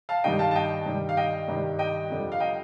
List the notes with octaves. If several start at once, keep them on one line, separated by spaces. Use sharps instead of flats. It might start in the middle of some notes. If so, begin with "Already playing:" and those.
F5 A5
G2 D#3 G3 D#5 G5
F5 A5
A5
D#5 G5
G2 D#3 G3
F5
D#5 G5
G2 D#3 G3
D#5 G5
F2 D3 G3
F5
D#5 G5